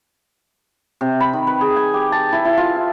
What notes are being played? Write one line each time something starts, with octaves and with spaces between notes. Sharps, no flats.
C3
B5
D#3
B4
G#4
G#5
G4
A5
E4
E4
F4
E5